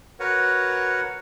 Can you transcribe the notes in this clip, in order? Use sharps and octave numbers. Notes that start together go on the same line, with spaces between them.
F#4 A#4 B4 C#5 F#5